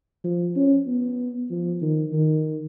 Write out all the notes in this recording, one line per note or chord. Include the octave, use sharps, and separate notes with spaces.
F3
C#4
B3
F3
D#3
D#3